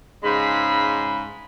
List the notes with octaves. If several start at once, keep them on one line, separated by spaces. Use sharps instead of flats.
G#2 C#3 G#3 B5